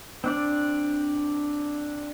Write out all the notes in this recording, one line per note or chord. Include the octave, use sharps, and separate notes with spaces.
C4 D4 D5